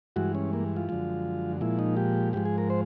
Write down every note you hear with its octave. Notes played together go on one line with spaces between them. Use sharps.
G2 E3 G#3 F#4
C#4
A#3
F4
F#2 D3 F3 G#3
A#2 F3 G#3 E4
D#4
G4
G#2 F3 G#3 G4
G#4
A#4
C5